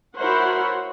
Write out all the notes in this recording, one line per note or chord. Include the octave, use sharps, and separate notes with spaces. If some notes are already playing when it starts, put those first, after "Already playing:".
E4 F#4 A#4 C5 C#5 F#5